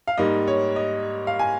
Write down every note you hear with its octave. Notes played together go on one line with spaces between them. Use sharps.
F5
G#2 G3 A#3 D#5
C#5
D#5
F5
G#5